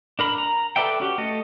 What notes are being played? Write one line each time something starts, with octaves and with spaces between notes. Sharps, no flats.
D4 A#4 B5
A#5
A4 B4 D5 E5 G5
C#4 F#4 G4
A3 A4 D#5